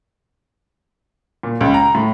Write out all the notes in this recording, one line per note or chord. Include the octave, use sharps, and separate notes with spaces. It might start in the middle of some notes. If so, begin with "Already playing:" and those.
A#2
C#2
A#5
A2